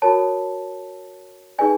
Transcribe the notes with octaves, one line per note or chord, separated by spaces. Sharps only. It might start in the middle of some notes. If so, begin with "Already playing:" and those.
F#4 A#4 C#5 A5
D#4 G#4 B4 D5 G#5